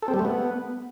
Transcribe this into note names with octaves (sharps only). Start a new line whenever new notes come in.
A4
C4
G3
A3
B3